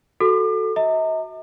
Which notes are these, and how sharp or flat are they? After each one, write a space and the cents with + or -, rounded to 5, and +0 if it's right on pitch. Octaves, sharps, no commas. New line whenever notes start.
F#4 +0 A4 +0 D6 +35
D#5 +45 A#5 -35